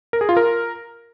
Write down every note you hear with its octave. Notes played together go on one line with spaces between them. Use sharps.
A#4
G#4
F4
A#4